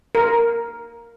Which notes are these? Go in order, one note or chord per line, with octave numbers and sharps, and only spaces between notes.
A#4